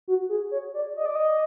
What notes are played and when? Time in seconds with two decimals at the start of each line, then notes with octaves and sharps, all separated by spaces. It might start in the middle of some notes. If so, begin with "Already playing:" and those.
0.08 F#4
0.29 G#4
0.51 C#5
0.74 D5
0.96 D#5
1.06 D5
1.16 D#5